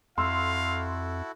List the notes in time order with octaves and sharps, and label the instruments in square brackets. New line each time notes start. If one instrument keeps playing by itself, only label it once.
[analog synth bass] F2 [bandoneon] E4 F#4 A4 [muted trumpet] F5 [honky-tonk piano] C6 E6